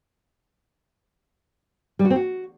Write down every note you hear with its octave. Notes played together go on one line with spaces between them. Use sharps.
G3
F#4
C4
F#4